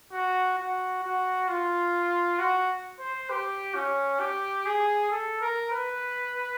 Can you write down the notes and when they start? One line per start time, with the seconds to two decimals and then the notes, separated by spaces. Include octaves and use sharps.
0.12 F#4
0.58 F#4
1.03 F#4
1.48 F4
2.39 F#4
2.99 C5
3.30 G4
3.75 C#4
4.20 G4
4.66 G#4
5.11 A4
5.41 A#4
5.71 B4